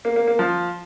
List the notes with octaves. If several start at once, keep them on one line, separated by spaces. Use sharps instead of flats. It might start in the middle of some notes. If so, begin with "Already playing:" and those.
A#3
A#3
A#3
F3